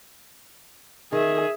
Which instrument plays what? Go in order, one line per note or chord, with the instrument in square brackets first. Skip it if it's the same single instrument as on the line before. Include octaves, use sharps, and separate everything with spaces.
[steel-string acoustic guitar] D#3 [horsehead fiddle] G#4 E5